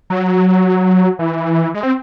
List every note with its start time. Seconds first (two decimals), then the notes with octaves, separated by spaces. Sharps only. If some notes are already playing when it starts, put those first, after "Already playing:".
0.10 F#3
1.19 E3
1.74 G#3
1.83 C4